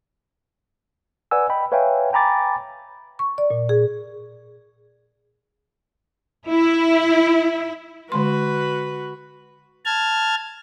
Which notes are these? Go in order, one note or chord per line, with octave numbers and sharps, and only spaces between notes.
B4 D5 F#5 G#5 E6
D#5 G5 B5
B4 C#5 E5 F5 G5 G#5
G5 G#5 A#5 B5 D6 A6
C#6
D5
A#2
G#4
E4
D3 G#3 F#4 B4 C6
A5 F6 G#6